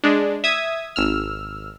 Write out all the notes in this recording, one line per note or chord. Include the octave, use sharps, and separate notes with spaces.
G#3 D4
E5 D#6 G#6
G#1 E6 F6